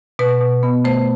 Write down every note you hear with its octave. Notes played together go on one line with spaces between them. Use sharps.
B2 B4
B2
B3
A3 C5